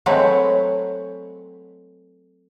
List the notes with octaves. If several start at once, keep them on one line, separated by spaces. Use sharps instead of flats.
F#3 G#3 A3 C4 B4 C#5